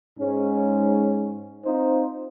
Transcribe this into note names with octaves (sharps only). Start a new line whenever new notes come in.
G#2 C#4
C4 D#4 F4 C5